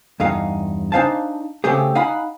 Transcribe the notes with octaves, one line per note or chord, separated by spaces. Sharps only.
E2 G2 D#4 F5
D4 D#4 C5 F5 G#5 A5
C#3 A3 C4 G4 G#4
D#4 F5 F#5 G#5 B5